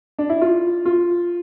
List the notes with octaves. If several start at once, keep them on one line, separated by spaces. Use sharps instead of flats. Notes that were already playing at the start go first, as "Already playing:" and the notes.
D4
E4
F4
F4